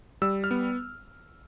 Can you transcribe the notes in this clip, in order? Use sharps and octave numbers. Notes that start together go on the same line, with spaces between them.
G3 E6
F6
B3